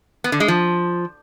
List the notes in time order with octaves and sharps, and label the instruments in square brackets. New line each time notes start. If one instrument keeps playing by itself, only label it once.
[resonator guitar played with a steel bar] B3
D3
G#3
F3